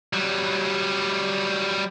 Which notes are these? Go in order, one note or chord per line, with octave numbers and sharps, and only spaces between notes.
F#3 G3